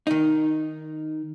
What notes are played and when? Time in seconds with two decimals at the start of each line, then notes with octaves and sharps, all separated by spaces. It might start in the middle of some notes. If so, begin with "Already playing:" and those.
0.07 D#3 D#4